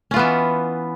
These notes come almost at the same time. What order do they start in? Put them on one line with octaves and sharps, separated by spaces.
C#4 F4 B3 E3